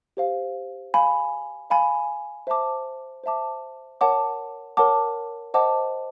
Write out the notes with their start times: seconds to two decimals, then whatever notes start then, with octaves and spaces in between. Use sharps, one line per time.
0.17 G4 C5 F5
0.94 F5 G#5 B5
1.70 F5 G#5 B5
2.47 C5 E5 A5 D6
3.24 C5 E5 A5 D6
4.01 A#4 C#5 F#5 A5 D6
4.77 A#4 C#5 F#5 A5 D6
5.54 C5 D#5 F#5 A5 D6